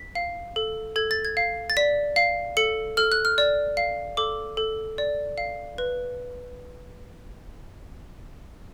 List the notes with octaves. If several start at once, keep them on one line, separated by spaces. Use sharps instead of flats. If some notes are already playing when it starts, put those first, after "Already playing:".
Already playing: B6
F5
A4
A4 G#6
A6
G#6
F5
A6
D5 B6
F5
A4 C#7
A4 F6
F#6
F6
D5
F5
A4 D6
A4
D5
F5
B4